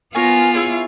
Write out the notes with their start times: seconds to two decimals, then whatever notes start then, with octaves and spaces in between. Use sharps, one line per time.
0.15 B3 F4 A#4 C#5 G#5
0.54 E4 G#4 C#5